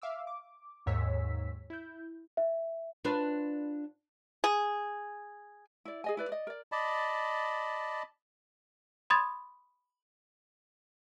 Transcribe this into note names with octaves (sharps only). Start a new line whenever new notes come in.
E5 F5 D6 E6
D6
D#2 G#2 C#5 E6 B6
E4 G6
E5
D4 F4 B4
G#4
E4 D5
G#4 D#5 G#5
E4 B4 D5
D5 D#5
A#4 D5
D5 D#5 A5 B5
B5 C6 D#6 G#6 A6